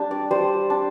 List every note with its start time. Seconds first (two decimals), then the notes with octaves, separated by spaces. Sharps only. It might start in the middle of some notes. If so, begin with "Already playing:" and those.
Already playing: G3 D4
0.11 D5
0.31 G3 C5
0.70 D4